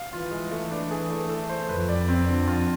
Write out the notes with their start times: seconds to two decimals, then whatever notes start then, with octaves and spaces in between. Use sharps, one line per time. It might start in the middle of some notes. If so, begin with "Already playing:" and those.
Already playing: F5
0.12 E3 F4
0.31 G#3
0.51 A3
0.71 D4
0.91 G#4
1.10 A3
1.29 A4
1.49 C5
1.68 F2 B4
1.89 D5
2.09 C4
2.28 D3
2.48 F4